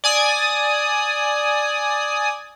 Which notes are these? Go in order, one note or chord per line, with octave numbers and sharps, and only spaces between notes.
D5 G#5 D#6